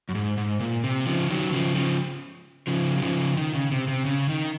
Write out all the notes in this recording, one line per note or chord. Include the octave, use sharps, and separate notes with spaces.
F#2
G#2
G#2
A#2
C3
C#3 F3
D#3 F#3
C#3 F3
C#3 F3
C#3 F3
F#3
C#3 F3
D#3
C#3
C3
C3
C#3
D#3